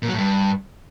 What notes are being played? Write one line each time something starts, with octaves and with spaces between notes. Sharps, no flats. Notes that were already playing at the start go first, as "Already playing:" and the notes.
A#2
F#3
A2
G2